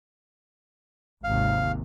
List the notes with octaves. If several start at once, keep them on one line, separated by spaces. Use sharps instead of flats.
G#1 D#2 C3 F5